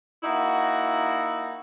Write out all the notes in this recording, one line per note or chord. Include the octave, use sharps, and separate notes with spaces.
A#3 D#4 E4 F#4